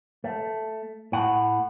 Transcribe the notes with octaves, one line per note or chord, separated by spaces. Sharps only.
A3
A2 F#5